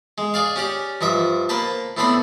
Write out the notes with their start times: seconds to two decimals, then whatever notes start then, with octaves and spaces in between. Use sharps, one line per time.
0.18 G#3
0.34 G#4 D5 F5
0.56 C#4 G4 D5
1.01 G2 F3 D#5 E5
1.49 A#3 B4 C5 A5
1.97 A2 B3 C4 D4 C5 B5